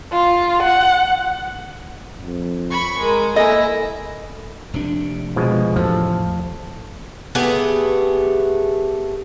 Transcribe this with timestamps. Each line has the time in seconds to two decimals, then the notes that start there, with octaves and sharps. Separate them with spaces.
0.13 F4
0.63 F#5
2.21 F2
2.70 B5 C#6
2.99 G#3 A#4
3.36 A#3 E4 A4 D#5 G#5
4.74 F1 C3 D4
5.36 B2 F3 G#3
5.76 E2 A2 C3 F3 A4
7.35 A3 B3 G4 G#4